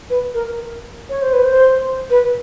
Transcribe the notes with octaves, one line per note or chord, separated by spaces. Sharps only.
B4
A#4
C#5
C5
B4
C5
B4